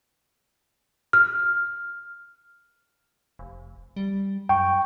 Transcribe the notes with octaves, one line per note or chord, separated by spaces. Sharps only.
F6
F1
G3
F#2 G5 C#6